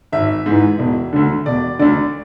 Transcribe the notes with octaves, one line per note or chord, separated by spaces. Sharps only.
G#1 E5
G#2 E3
E1
D2 D3
E1 D5
D2 D3 D5